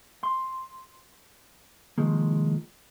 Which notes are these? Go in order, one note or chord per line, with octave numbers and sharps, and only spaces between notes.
C6
C2 G#2 D#3 F3 G#3 A#3